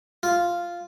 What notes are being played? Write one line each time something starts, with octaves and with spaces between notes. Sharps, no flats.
F4